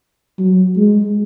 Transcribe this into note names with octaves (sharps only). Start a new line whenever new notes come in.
F#3
G#3